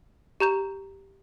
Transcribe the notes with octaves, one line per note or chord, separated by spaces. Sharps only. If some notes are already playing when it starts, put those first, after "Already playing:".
G4 A#5 G6 E7